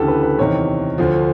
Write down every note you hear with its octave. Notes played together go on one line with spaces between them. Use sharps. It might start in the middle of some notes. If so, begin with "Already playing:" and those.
Already playing: D2 C#3 E3 G4 A4
B4
B4
E2 C3 D#3 C#5
D2 D3 F3